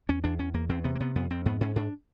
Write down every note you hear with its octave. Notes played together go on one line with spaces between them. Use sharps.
E2 C#4
E2 D4
E2 C#4
E2 A#3
E2 C4
C3 B3
A#3
C3 B3
F2 B3
F2 C4
G#2 B3
G#2 C#4
G#2 D4